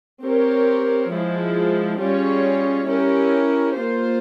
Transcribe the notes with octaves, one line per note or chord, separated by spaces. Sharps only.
C4 G4 A#4 C#5
F3 G#3 E4
G3 C#4 F4 G#4 C#5
C#4 E4 G4 A#4
A#3 F4 C5